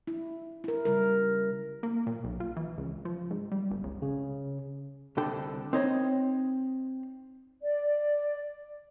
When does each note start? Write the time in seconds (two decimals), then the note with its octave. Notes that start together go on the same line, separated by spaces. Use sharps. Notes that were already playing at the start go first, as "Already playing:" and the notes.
0.07 E4
0.64 E4 A#4
0.85 C#3 G3 A#4
1.83 A#3
2.07 A#2
2.24 B1
2.40 F4
2.57 E3
2.78 C#2
3.05 F3
3.31 G#2
3.51 G3
3.71 G1
3.84 C#2
4.02 C#3
5.17 C2 D3 D4 A4 G5
5.73 C4 D#4 C#5 D#5 A#5 B5
7.63 D5